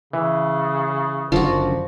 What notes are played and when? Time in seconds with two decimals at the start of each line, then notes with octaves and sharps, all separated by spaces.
0.13 C#3 E3
1.32 F#1 F#2 D3 F3 F#4